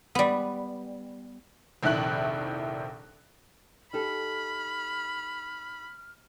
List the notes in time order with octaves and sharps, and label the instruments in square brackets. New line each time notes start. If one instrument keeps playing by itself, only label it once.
[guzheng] G3 B3
[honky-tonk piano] F1 A#1 D#3 E4 F#6 F#7
[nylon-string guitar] D#4 G4 A4 [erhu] B5 [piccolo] F6